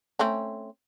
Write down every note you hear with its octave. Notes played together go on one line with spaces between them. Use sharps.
A3 C4 C#4